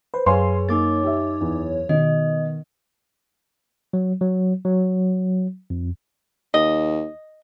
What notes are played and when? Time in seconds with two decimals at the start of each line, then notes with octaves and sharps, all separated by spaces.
0.14 B4 C5
0.26 F#2 G#4 B4 C#5 F5 G#5 C6
0.69 A#3 D#4 D6 A6
1.03 G4 E5
1.41 E2
1.89 B2 D#3 D#5
3.93 F#3
4.21 F#3
4.65 F#3
5.70 F2
6.54 D#2 D#5